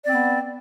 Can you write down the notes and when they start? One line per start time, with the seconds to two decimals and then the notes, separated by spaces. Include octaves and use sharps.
0.04 D5
0.08 C4
0.12 B3